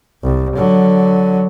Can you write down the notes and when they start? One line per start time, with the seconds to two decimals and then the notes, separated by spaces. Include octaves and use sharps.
0.23 C2
0.56 D3 F#3